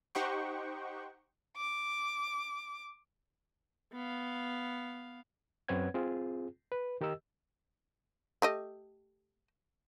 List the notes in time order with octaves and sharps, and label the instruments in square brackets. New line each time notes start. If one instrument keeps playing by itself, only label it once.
[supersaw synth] D#4 G4 C5 F#5 G5 C#6
[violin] D6
[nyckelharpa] B3 F5
[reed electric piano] F#2 C4 B4 C#5 F#5 G#6
C4 F4 G#4
B4
D#3 G4 A#4 D#5 E6
[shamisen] A3 G4 D#5